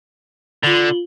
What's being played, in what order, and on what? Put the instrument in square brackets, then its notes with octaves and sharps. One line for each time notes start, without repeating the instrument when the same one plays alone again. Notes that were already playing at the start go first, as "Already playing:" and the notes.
[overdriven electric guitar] D3 [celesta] F4 F#7 G7